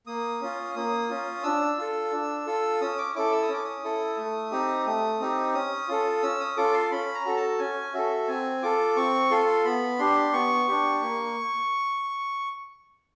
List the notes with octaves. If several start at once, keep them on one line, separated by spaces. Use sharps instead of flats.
A#3 D#6
C#4 F4
A#3 D#6
C#4 F4
D4 E6
F4 A4
D4
F4 A4
C#4 D#6
D6
E4 A4 D6
E6
D#6
C#4 D6
D#6
E4 A4
A3
C4 D#4 G4
A3 D#6
C4 D#4 G4
C#4 D#6
F4 A4
C#4 E6
D#6
F4 A4 D6
C6
C#4 B5
A#5
F#4 A4
A5
C#4 G#5
F#4 A4 E5
C4 G#5
F4 A4 D6
C4 C#6
F4 A4 C6
B3 B5
D4 G4 C6
B3 C#6
D4 G4
A#3